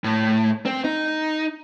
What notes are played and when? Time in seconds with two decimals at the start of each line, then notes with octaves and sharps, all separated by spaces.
0.04 A2
0.66 C4
0.84 D#4